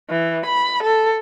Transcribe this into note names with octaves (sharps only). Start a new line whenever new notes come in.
E3
B5
A4